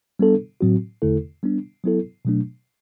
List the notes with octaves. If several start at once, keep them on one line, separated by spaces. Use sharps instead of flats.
G3 B3 D4 A4
A2 F#3 C4 F#4
E2 D3 A3 E4 A4
G3 B3 D4
F#3 B3 E4 A4
B2 F#3 A3 D4